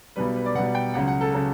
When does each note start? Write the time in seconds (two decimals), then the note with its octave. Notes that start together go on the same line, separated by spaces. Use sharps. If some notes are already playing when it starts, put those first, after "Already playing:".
0.16 B1 B2 G3 B4
0.36 B4
0.46 D5
0.55 B1 B2 G3 F#5
0.75 G5
0.94 C#2 C#3 F#3 F#5
1.08 F#5
1.21 A4
1.34 C#3 F#3 A4